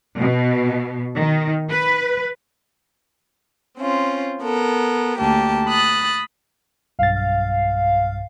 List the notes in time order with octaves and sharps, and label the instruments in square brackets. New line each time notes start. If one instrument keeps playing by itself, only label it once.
[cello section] B2
D#3
B4
[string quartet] C4 C#4 F4
B3 A4 A#4
D2 A#3 G4 A5
B5 D#6 F#6 A6
[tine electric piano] B1 G2 A6 [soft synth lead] F5
[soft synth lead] F5